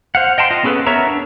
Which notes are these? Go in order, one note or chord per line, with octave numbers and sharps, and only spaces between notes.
C5 F5 F#5
D#5 G5 A5 C6
F4 D#5
B3 C#4 G#4 A4 B4
B3 A#4 C#5 E5 A#5
D4